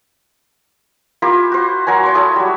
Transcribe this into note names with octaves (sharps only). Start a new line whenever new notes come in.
A#3 E4 F4 G4
F#4 C5
F#3 A#4 C#5 G#5
C#5 C6
E4 A4 C#6 D#6
F#3 G3